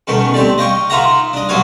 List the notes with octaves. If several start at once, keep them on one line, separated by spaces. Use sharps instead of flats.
B2 D#3 A3 C#4
A3 C4 G4 D5
D#5 F5 G5 C#6
D#4 F4 A#4 E5 F#5 A#5
D4 D#5
B1 F#3 D#4 F4 C#5 F5